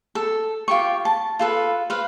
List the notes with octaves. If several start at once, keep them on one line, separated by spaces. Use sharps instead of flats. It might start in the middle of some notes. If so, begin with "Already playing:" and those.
A4
F4 G4 C#6
A5
F4 A4 B4
B4 C5 F5